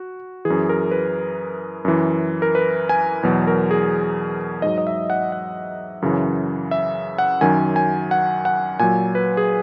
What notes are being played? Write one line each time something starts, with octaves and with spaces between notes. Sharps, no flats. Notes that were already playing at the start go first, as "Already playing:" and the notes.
Already playing: F#4
E3 G#4
F#2
A#4
B4
F#2 E3
A#4
B4
G#5
E2 B2 F#3
A#4
G#4
G#2 F#3 D#5
D#5
E5
F#5
F#5
F#2 C#3 E3
E5
F#5
F#2 D#3 F#3 G#5
G#5
F#5
F#5
A#2 F#3 G#5
B4
G#4